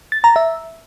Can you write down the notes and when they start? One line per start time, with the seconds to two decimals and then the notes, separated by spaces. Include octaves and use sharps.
0.12 A6
0.24 A#5
0.36 E5